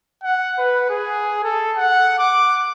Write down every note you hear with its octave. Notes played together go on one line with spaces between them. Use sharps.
F#5
B4
G#4
A4
F#5
D6